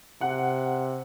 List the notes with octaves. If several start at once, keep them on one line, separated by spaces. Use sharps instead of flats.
C3 F#5